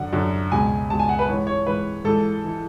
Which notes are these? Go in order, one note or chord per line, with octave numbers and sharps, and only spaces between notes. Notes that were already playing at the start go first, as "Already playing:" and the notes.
Already playing: F#2 D3 F#5
F#2 D3
C#2 B2 G#5
C#2 B2 A5
G#5
F#5
B4
G#2 E3 C#5
C#5
G#2 E3 B4
G#2 E3 A4
E3